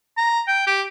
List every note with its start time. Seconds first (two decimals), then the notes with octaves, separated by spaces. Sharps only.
0.17 A#5
0.47 G5
0.67 G4